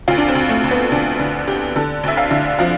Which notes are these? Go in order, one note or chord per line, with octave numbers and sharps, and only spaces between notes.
D2 F4
D4
C4
D2
A3
D2
B3
D2 D4
D3
D2 G4
D3 A4
D2 E5
F5
D3
F3 F5